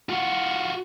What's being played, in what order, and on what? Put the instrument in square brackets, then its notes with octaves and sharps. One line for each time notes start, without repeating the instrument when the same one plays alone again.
[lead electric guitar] F4 F#4